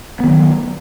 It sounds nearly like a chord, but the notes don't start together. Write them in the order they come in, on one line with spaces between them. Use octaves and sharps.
B3 D#3 F#3